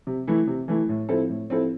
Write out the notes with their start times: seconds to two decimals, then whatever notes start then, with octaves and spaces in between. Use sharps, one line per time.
0.07 C3
0.27 E3 A3 E4
0.47 C3
0.68 E3 A3 E4
0.89 A2
1.09 F3 C4 E4 A4
1.30 A2
1.50 F3 C4 E4 A4